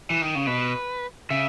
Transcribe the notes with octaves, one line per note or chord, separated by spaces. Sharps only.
E3
D#3
C#3
B2 B4
C#3 E5